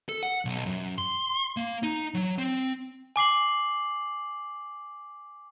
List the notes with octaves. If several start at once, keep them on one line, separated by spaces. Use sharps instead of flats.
A4
F#5
B1
F#2
C6
A#3
D#4
F#3
C4
G#5 D6 C7 F#7